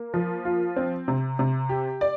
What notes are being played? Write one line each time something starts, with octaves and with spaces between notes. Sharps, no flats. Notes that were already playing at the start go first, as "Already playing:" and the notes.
Already playing: A#3
F3
F4
C4
C3
C3
G4
D5